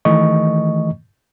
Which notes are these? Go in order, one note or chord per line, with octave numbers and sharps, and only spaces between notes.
D#3 E3 A3 D#5 C#6